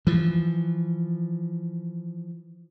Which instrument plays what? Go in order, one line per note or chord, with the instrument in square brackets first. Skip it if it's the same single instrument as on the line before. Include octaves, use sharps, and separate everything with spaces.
[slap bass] E3 F3